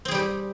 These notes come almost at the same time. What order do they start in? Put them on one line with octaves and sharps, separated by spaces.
C4 G#4 G3 G4